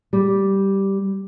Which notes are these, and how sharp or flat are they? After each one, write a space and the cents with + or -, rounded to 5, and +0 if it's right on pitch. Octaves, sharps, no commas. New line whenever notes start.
G3 -5